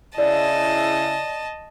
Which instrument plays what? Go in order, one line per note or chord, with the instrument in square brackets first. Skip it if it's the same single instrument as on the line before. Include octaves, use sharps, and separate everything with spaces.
[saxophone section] C#3 E4 [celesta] D5 [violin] D#5 A5